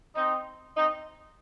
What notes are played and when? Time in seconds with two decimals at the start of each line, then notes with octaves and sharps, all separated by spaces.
0.16 C4 D#4
0.76 C4 D#4